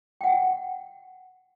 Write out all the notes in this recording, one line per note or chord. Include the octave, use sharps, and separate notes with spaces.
F#5 G5